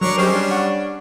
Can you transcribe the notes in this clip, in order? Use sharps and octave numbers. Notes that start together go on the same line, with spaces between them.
F#3 D4 A#4 C#5 C#6
G3 G#3 C#4 G4 C5 D#6 F6
D4
F#5 C#6